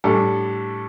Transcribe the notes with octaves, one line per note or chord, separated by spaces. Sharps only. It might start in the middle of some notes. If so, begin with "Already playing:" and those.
A2 G3 D4 A4